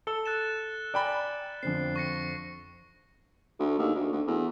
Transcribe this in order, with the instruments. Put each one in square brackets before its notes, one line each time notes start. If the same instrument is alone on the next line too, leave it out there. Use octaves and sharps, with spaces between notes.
[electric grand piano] A4 E6 [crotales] C#7 G7
[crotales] F#6 A6 E7
[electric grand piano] D5 G5 B5 [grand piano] G#5 A#5
[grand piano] F2 D3 C4 [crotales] C7
[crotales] C#6 A#6 C#7
[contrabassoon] D2
D#2
D2
D2
E2